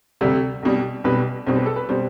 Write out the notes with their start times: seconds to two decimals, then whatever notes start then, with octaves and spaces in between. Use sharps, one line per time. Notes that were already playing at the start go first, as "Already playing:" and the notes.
0.21 D2 C3 G3
0.63 B1 B2 G3
1.04 B1 B2 G3 B4
1.47 B1 B2 G3 C5
1.56 B4
1.66 A4
1.76 B4
1.89 B2 G3 C5